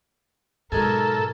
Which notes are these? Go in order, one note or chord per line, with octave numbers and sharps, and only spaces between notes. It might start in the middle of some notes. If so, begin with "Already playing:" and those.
B1 G#2 G#3 A4 A#4 G#5